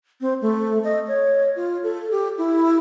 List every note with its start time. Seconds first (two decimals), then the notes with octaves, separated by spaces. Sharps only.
0.21 C4
0.41 A3
0.84 D#5
1.08 C#5
1.56 F4
1.83 A4
2.11 G4
2.38 E4